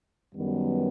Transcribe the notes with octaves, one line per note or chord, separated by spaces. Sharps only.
F#2 D#3 G3 B3